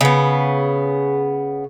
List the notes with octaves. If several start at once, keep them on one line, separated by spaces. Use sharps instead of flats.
C#3 B3